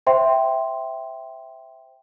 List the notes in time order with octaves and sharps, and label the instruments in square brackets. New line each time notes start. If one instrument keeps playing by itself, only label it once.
[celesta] C5 E5 G5 C6